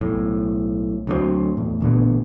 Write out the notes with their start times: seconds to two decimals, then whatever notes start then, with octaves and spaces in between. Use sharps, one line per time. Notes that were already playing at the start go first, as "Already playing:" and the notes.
0.01 B1 A2
1.07 D2 F#3 G#3 C4
1.57 E2 A2
1.81 A1 A#2 D3 B3